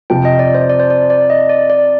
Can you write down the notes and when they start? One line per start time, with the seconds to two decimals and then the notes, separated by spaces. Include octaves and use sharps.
0.10 F2 C3 F3 G5
0.25 D#5
0.39 D5
0.55 C5
0.70 D5
0.80 C5
0.90 D5
1.10 D5
1.30 D#5
1.49 D5
1.70 D5